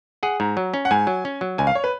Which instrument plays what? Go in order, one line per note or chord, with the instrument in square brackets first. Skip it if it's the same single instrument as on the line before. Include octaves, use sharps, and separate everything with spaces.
[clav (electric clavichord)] G#4 [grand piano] F#5
[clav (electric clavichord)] G#2 [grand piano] A#5
[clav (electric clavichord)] F#3
C#4
[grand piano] F#5
[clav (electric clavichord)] G#2 [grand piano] G#5
[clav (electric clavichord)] F#3
C#4
F#3
[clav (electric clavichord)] C#2 [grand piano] G#5
[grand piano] F5
C#5
B4